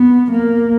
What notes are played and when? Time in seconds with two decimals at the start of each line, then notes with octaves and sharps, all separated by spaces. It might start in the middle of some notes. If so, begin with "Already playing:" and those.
Already playing: B3
0.31 A#3